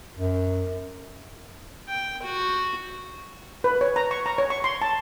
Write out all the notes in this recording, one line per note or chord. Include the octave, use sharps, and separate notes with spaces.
F#2
G5
F#4
B4
C#5
A#5
C#6
A#5
C#5
C#6
C6
A5